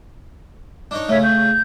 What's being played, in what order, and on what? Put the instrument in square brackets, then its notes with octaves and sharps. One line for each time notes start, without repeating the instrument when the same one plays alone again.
[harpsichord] D4 D#4 C#5
[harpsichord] C#3 A3 [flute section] C#5 E5
[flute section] G6